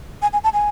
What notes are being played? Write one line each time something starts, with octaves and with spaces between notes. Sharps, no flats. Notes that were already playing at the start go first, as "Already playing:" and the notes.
G#5
G#5
A5
G#5